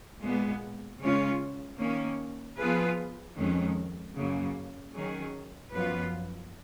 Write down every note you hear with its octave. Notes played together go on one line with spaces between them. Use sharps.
A#2 G#3 B3
C#3 G#3 C#4 F4
D#3 A#3 C#4
F3 B3 F4 G#4 B4
F2 D#3 G#3 C#4
F#2 C#3 F#3 A#3
D#3 F#3 C#4 G#4
F#2 F3 B3 F4 B4